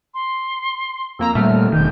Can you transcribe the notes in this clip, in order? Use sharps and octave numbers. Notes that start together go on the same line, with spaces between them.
C6
F2 A#3 A#5 E6
A#2 G3 A3 F6
E1 D#3 G6